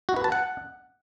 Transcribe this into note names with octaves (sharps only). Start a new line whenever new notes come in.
F#4
B4
A5
F#5